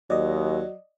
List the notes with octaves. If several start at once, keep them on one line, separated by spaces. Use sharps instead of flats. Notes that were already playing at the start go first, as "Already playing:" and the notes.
D#2 F#3 D5 D#5